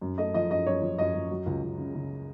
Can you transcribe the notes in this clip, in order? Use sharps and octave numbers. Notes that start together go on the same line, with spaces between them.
F#2
A3 D#5
F3 D#5
F#2 D#5
F#2 C#5
F3
F#2 D#5
F#2
F#3
C#2
C#2
C#3
C#3